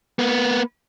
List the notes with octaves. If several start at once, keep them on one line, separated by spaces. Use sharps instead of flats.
A#3 B3